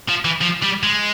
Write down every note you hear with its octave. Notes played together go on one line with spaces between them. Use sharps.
F3
E3
F3
G3
G#3